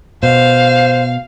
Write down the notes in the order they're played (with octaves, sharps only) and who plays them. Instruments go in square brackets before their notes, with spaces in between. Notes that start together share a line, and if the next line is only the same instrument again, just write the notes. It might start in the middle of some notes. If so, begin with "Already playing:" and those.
[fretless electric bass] B2 [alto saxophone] C5 [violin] F5